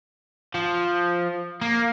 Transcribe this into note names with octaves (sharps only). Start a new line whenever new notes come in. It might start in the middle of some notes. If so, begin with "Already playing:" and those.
F3
A#3